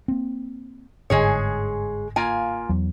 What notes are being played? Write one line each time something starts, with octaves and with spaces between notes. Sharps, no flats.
A#3 C4
G1 G#2 D3 G#3 G#4 C#5
A#3 F4 G#5
E2 F#3